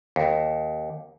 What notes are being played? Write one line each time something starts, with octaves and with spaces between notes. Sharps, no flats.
D#2